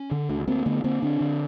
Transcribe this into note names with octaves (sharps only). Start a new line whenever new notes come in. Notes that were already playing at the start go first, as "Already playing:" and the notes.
Already playing: C#4
D3
D2
D2 A#3 C4
D3 A3 B3
D3 A#3 C4
D3 C4 D4
D3